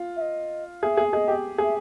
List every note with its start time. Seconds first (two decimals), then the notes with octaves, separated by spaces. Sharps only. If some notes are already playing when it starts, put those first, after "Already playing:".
Already playing: F4
0.17 E5
0.21 D#5
0.83 G#4 E5
0.97 G#4
1.12 G#4 D#5
1.28 G4
1.58 G#4
1.64 E5